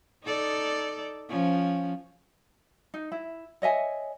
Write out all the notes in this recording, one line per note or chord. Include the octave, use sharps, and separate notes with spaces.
D#4 A4 D5
F3 C#4
D#4
E4
C#5 D#5 E5 G#5